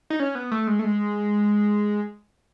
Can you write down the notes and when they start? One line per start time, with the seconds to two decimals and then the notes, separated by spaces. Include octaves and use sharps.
0.10 D#4
0.20 C#4
0.35 B3
0.51 A3
0.67 G#3
0.79 A3
0.84 G#3